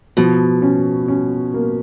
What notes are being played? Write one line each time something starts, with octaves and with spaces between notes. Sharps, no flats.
B2 F3
C#4
C#4
A#3